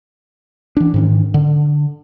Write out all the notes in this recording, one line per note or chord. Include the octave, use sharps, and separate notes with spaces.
E3 D4
G#2 D#3 C#4
D3